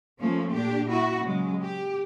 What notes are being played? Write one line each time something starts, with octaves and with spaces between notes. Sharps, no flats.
F3 A3 A#3 C#4
A#2 D4 G4
E4 F#4
C#3 F#3 G#3
G4